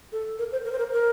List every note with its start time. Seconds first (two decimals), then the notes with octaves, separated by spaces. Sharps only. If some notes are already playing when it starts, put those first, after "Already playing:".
0.12 A4
0.39 A#4
0.52 C5
0.65 A#4
0.72 C5
0.79 A#4
0.92 A#4